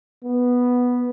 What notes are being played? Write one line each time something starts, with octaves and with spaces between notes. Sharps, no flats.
B3